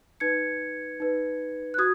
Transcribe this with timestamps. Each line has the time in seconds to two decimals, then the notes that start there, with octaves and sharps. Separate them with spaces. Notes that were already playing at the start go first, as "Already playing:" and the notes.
0.20 D#4 B4 G#6 C#7
1.00 D#4 B4
1.74 F#6
1.78 F#4 D#6 G#6